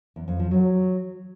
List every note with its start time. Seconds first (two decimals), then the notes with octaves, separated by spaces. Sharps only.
0.16 E2
0.28 F2
0.39 F3
0.51 F#3